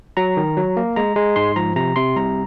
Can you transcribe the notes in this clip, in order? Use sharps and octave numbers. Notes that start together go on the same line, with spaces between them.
F#3 A#5
D#3
F#3
A#3
G#3 A#5
G#3
G#2 C6
F3 A#5
C3 A#5
C3 C6
C2 A#5